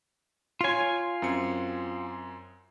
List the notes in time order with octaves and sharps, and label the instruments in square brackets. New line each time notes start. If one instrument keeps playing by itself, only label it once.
[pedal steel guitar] F4 G#5 [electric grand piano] C#5 C6
[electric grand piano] F#2 C4 C#7